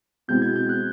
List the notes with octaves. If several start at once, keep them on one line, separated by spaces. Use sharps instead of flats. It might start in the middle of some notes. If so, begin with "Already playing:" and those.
B2 G#3 C4 E4 G6
G#6
G6
F#6